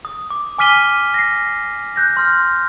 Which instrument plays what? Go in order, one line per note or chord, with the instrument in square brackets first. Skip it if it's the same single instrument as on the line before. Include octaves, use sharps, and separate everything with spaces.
[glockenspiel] D#6
D6
G#5 D6 F6 B6 D#7 G7
A#6 C7
F#6 G6 A#6
C6 F6